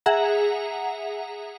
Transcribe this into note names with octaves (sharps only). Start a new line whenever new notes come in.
G#4 E5 F#5 A#5